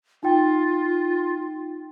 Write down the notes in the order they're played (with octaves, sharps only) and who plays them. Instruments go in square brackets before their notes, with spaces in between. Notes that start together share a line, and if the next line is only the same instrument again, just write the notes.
[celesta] D#4 G5 [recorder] F4